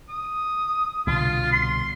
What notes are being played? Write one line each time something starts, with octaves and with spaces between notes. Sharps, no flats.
D#6
C2 B2 D3 F4
C6